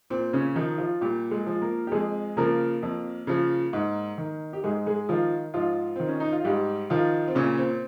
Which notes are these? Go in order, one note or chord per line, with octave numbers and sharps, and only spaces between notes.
A#2 C4
C#3 C#4
D#3 F3 D#4
F3 F4
A#2 G3 G4
G#3 G#4
F3
A#3 A#4
G4
F2 G#3 G#4
C#3 F3 A#3 A#4
F2
C#3 F3
G#2
D#3
G4
G#2 G#3 G#4
G#3 G#4
D#3 F3 F4
G#2 F3 F4
D#3 C4
C#4
D#4
F4
G#2 G3 G4
D#3 F3 F4
C4
A#2 C#3 C#4
C4